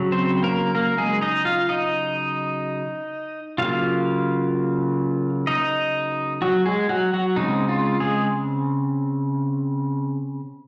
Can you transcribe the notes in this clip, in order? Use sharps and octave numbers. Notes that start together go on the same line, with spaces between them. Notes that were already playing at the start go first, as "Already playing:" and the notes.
Already playing: C#3 F#3
C4 C5
A#3 A#4
A#3 A#4
G#3 G#4
D#4 D#5
F4 F5
D#4 D#5
C#3 F#3 A#3 F4 F5
D#4 D#5
F#3 F#4
G#3 G#4
F#3 F#4
F#3 F#4
C#3 G#3 C4 D#4
F4
G#3 G#4